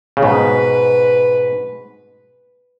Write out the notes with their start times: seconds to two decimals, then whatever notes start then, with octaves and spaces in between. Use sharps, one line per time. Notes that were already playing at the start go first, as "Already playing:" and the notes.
0.17 C#3
0.22 G#2 B2 B4